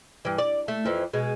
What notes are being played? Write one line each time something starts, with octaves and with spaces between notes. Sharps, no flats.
G2 E3
D5
A3
F2 E3
B2 G#3